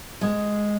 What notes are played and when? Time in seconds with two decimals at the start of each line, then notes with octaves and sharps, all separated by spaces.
0.21 G#3